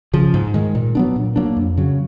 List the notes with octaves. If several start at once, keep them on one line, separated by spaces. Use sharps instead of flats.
C#3 F3
G#2
D#3 G#3
A#2
F#3 B3 D4
A#2
F#3 A#3 D4
F2
C#3 F#3